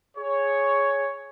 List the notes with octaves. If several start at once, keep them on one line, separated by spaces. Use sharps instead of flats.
G#4 C#5